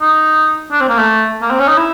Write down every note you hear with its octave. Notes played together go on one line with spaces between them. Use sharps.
D#4
D4
C4
A#3
A3
A#3
C4
C#4
D#4
E4